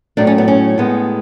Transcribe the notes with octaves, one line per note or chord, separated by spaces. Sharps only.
A2 F#3 A3 D4
C#4
B3
C#4
A2 G#3 B3